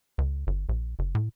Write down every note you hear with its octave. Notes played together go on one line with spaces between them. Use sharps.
C#2
G1
A#1
F#1
A2